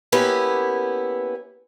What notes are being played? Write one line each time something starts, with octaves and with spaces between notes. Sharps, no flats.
A#3 B3 C#4 E4 G4 B4